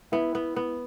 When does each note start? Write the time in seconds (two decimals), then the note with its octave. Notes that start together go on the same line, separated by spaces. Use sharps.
0.12 B3 E4
0.35 B3
0.56 B3